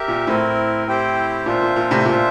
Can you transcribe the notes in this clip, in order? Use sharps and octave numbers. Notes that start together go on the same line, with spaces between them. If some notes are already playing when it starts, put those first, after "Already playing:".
Already playing: G4 A#4 E5
A#2
A2 C4 E4 A#4
C4 E4 G4 C5 G5
A#2 D4 F4 C5 E5
A#2
A#2
A2 C3
A#2 D4 F4 C5 E5